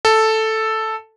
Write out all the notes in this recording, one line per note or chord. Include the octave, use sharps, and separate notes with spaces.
A4